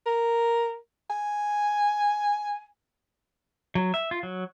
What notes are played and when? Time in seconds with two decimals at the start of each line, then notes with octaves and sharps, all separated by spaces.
0.06 A#4
1.10 G#5
3.75 F#3
3.94 E5
4.11 F4
4.23 F#3